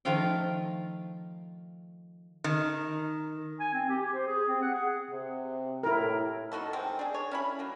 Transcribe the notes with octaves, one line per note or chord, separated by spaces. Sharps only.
D#3 F3 A3 F4 F5 G5
D#3
G#5
C4
G4
G4
C5
G#4
C4
F#5
G#4
C3
A2 E4 A#4
B3 D#4 F#4 A4
C3 D#3 G#3 C4
D4 G#4
C#5
C#4 E4 B5
F#3 A#3